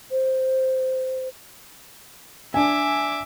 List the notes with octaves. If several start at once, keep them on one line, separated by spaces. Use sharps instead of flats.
C5
D4 E5 G#5 D6